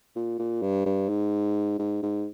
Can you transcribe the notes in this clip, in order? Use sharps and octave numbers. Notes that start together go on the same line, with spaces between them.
A#2
A#2
G2
G2
G#2
G#2
G#2